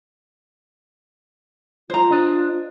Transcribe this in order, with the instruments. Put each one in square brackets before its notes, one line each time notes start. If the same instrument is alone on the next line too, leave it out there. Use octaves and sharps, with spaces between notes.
[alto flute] F4 [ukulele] C5 A#5
[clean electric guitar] D4 D#5